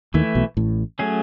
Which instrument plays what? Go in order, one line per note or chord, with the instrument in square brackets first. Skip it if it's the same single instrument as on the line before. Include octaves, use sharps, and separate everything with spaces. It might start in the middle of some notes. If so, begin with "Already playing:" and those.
[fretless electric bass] D#2 D#3 [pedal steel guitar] E3 A3 E4
[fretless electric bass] B1 B2
A1 A2
[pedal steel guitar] F#3 A3 C#4 G#4